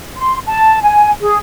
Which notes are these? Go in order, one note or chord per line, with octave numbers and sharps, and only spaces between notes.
C6
A5
G#5
G#4